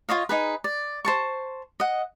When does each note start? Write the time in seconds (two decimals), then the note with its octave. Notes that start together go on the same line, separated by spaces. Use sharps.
0.09 F4 C#5 D#5 F5
0.29 D#4 G#4 B4
0.64 D5
1.05 C5 A5 C#6
1.80 D#5 F#5